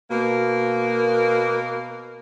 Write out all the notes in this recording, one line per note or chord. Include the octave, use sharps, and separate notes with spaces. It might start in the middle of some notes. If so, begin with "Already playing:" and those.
B2 A#3